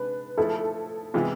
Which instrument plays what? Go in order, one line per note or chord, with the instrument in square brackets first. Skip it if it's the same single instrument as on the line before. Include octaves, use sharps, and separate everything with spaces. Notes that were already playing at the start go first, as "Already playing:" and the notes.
Already playing: [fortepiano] C3 G#3 D4 [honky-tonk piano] B4
[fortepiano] F3 A3 E4 G#4 [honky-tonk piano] A4
[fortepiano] C3 E3 G#3 B3 E4 [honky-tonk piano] F4